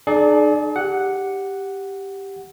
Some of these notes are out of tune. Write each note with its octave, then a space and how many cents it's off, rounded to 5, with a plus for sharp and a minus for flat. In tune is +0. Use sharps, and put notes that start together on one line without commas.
D#4 -45 G#4 +40 D5 +0
G4 +0 F#5 +0